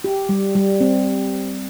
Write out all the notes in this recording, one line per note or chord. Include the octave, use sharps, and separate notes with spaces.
G4
G3
G3
C4